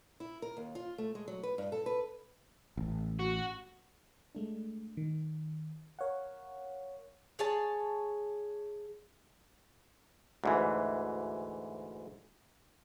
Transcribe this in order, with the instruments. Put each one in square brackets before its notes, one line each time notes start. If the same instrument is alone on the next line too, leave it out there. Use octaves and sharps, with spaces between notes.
[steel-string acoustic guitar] E4
A#4
D#2
F4
A3
G#3
F#3
B4
G2
A4
B4
[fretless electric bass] A1
[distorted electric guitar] F#4
[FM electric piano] G#3 A3 D4
D#3
A#4 C#5 F5 F#5
[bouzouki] G#4 C#5 A5
[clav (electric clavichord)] D2 G#2 E3